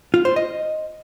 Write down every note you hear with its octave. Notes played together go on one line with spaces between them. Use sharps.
F4
C5
D#5